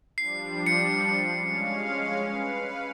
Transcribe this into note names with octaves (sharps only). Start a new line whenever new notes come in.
F3 G3 D4 C7
C#7
G#3 C#4 F5
B4 F5